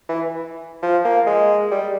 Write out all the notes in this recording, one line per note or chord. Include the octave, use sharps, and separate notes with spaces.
E3
F3
A#3
G#3
G3